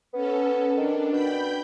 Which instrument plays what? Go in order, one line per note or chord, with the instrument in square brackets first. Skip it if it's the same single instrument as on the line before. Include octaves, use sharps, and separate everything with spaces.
[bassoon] B3 [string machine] C#4 A4
[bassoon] D#3 [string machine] D4
[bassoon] B2 [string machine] G5 B5 G6